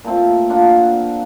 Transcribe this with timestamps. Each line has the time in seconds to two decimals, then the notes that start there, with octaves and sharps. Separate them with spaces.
0.04 A#2 A3 C4
0.49 A#3 D4 F4 F#5